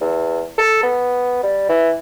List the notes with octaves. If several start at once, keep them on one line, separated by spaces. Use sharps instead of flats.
E2
A4
B3
G3
E3